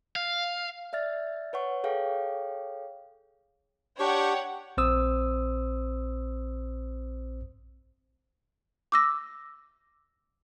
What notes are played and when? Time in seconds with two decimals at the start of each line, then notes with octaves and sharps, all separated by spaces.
0.16 F5
0.93 D5 E5 F6 A6
1.53 B4 C#5 F#5 C#6
1.84 G#4 A4 C#5 F5 G5
4.00 D4 G4 C#5 F#5 G5 C#6
4.77 A#1 C4 C5 D#6 E6
8.92 D6 E6 A#6